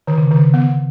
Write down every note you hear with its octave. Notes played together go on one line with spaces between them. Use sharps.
D3 D#3
C#3
C3 D#3
C#3
B3